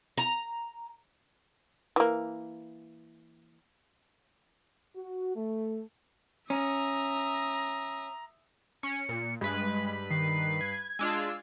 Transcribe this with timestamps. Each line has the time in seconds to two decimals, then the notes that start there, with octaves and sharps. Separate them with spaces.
0.17 A#5
1.96 E3 A#3
4.96 F#4
5.36 A3
6.50 C#4 E5 A#5 D#6
8.83 C#4 C#7
9.09 A#2
9.41 G2 G#3 B4 B5
10.10 D#3 C7
10.61 G#6
10.99 G#3 D4 F4 E6